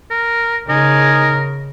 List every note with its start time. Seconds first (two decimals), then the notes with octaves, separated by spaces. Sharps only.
0.11 A#4
0.69 C#3 D#4 A#4 G#5